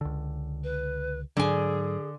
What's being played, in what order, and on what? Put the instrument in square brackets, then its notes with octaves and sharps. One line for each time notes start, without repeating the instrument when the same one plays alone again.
[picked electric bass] C#2 D3
[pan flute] B4
[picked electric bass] G#2 F#3 [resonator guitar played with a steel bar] D3 G#5 [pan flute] G#4